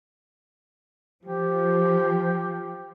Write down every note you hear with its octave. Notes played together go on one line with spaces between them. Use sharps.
F3 G4 C5